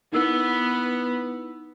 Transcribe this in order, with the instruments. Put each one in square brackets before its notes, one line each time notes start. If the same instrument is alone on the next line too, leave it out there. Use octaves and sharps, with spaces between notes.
[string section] B3 [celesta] D#4 E4 E6